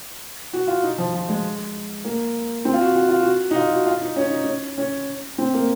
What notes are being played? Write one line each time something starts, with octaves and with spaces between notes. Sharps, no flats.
F#4
F4
D#4
F3
F3
G#3
A#3
C4
F4
F#4
F#4
F4
F#4
D#4
F4
F#4
F4
D#4
C#4
D#4
C#4
C#4
C4
A#3